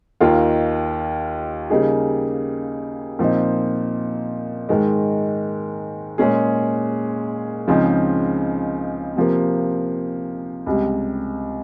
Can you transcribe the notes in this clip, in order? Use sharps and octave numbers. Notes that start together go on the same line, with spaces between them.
D#2 D#3 A#3 F4 A#4
C#3 G3 A#3 D#4 G#4
A#2 F3 C4 D#4
G#2 D#3 G#3
A#2 G#3 C#4 G#4
C#2 C#3 F3 C4 D#4
C3 F3 A#3
C#2 C3 G3